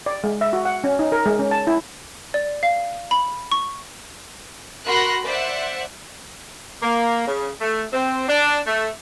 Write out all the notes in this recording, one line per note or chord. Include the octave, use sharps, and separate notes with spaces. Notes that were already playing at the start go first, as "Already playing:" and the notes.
D5
G#3
E5
F#4
F#5
C#4
D#4
A#4
G#3
C#4
A5
E4
D5
F5
B5
C#6
F#4 A#4 B5 C6 F#6 A#6
C5 D5 E5 F#5
A#3
C#3
A3
C4
D4
A3